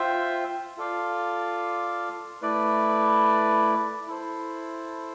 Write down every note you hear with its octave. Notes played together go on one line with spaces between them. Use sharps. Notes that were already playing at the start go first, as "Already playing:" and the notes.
Already playing: F4 C5 E5 G5
F4 A4 D5 F5
A3 E4 B4 D5
E4 A4 C5